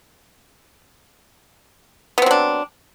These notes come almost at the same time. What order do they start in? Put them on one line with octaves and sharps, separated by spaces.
B3 C4 F#3 D4